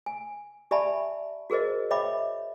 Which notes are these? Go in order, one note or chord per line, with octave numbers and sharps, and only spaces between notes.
G#5
G4 D5 E5 G#5 A5 B5
F#4 G#4 A#4 C5 D#5
C#5 D#5 E5 G5 B5 D6